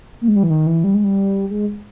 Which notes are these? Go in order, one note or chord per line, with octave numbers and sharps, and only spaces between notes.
A#3
G#3
G3
E3
D#3
E3
G3
G#3
G3
G#3